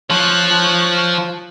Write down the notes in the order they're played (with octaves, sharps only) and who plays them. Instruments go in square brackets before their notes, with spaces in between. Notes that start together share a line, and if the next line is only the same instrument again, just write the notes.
[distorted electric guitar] F3 [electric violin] C#5 F#6